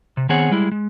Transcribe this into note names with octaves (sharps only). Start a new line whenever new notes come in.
C3
D#3 B3 C4 G#4 C#5 F#5
G3 G#3 E4
G#3